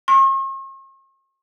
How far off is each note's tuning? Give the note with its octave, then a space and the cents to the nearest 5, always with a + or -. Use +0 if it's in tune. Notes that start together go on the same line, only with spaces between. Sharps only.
C#6 -45